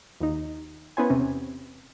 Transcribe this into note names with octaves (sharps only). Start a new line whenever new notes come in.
D#2 D#4
B3 C#4 E4 C5 G#5
E2 C3 C4 C#4